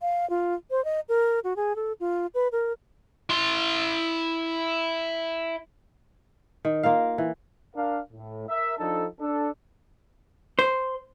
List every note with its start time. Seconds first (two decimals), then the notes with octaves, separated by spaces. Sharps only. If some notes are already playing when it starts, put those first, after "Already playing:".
0.02 F5
0.30 F4
0.71 C5
0.85 D#5
1.09 A#4
1.44 F#4
1.56 G#4
1.76 A4
2.00 F4
2.34 B4
2.52 A#4
3.30 E4 C6
6.65 D#3
6.83 A#3 F4 A#4 F5
7.18 E3
7.76 D4 A#4 F5
8.13 A2
8.48 A#4 E5
8.78 F3 D4 D#4 A4
9.20 D4 A4
10.59 C5